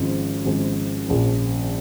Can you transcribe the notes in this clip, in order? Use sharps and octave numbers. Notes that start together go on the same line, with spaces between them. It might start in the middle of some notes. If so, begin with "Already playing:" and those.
Already playing: G#1 G#2 F3 C#4 G#4
G#1 G#2 F3 C#4 G#4
A#1 A#2 F3 C#4